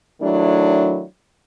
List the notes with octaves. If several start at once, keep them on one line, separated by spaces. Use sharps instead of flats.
D#3 F#3 A3 D4 E4